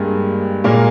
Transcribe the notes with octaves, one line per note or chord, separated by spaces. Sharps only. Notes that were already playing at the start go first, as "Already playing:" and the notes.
Already playing: G2 G3 G#3 A#3 G#4
A#2 G#3 A#3 A#4